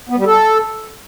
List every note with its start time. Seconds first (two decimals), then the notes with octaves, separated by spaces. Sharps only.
0.09 B3
0.18 G3
0.26 A4